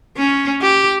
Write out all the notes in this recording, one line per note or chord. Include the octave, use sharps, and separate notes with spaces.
C#4
G4